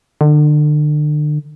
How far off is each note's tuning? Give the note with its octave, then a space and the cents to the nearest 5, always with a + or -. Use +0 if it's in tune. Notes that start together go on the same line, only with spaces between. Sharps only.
D3 +35